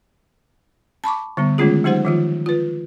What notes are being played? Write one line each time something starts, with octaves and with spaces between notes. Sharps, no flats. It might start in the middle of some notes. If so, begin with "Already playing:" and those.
A5 B5 C#6 D6
D3 G3 B3
D#3 G#3 A3 C#4 F4 G#4
F#3 G#3 D#4 G4 C5 F#5
D#3 F3 F4
F4 B4